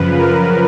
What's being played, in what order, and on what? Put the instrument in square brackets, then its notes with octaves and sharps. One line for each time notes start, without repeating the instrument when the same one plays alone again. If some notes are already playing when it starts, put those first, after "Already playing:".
Already playing: [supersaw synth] F#2 C#3 F3 B4
A#4